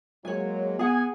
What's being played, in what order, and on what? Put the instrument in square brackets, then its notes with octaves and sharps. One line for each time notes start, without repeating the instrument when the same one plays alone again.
[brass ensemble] F#3 G#3 A#3 [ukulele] C#5 G#5
[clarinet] B3 [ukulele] G#4 F#5 [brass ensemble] G#5